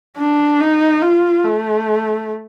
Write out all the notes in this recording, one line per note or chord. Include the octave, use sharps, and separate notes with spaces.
D4
D#4
F4
A3